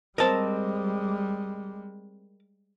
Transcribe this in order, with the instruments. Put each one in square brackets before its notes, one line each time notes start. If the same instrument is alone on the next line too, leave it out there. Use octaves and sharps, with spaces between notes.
[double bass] G3 G#3 [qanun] C4 D#5 [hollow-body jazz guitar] A#4 A5